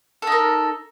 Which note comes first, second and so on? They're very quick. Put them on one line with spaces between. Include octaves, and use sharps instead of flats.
A4 D#4 A#4